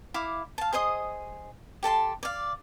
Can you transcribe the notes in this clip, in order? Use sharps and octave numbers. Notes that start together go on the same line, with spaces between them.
E4 F5 D6
F5 A5
G#4 C5 D#5 D#6
G4 A4 A5 C6
D5 F5